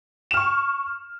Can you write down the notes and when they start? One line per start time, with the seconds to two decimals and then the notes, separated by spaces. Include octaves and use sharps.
0.31 E7
0.34 F6
0.37 C#6